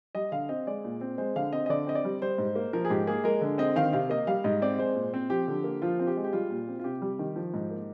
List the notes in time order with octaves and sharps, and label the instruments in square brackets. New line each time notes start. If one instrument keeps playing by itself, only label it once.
[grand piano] G3 D#5
D3 F5
C4 D#5
G#3 D5
A#2
C4
G#3 C5
D3 F5
C4 D#5
D#5
D3 D5
C4 D#5
D5
G3
G3 C5
G#2
A#3
F3 A#4
G#4
G#2 G4
A#3 G#4
G#3 A#4
D3
C4 D#5
D#3 F5
C3 F5
A#3 D#5
G3 F5
G#2 D#5
C4 D5
G#3 C5
A#2
C4
F3 G4
D3
A#3
F3 F4
C4 F4
G4
G#3
G4
G3 F4
A#2
C4
F4
C3 G4
G3
D#3
F3
G#2
A#3